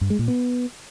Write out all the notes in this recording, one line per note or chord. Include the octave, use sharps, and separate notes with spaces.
G2
G#3
A#2
B3